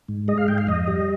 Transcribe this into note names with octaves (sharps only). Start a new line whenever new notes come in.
G#2
G#3 D#5
F5
G#2 G5
F5
F2 D#5
G3